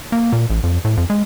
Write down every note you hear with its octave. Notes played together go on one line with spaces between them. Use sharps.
A#3
A#2
A1
F2
A2
F2
G#3